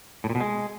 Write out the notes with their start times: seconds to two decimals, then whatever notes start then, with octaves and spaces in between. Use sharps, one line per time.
0.24 A2
0.30 A#2
0.35 B2
0.40 G#3